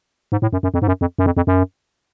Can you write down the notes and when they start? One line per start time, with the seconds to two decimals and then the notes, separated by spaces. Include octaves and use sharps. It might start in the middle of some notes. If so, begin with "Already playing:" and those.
0.32 G#2
0.42 A2
0.53 F#2
0.63 F#2
0.74 F2
0.82 G#2
0.88 F#2
1.01 F2
1.18 F#2
1.26 F2
1.37 F2
1.47 F#2